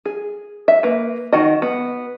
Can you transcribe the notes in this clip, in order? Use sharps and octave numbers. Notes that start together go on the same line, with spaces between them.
G#4
E5
A#3 B4
D#3 F#4 D#5
B3